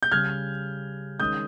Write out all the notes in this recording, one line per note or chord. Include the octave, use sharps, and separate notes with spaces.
G6
C#3 G3 C#4 F6 G#6
D#3 G#3 C#4 D#6 G6